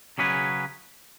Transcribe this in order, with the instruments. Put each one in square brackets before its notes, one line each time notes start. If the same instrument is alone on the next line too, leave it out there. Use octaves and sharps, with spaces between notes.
[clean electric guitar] C#3 F#3 C#4 G#4 B4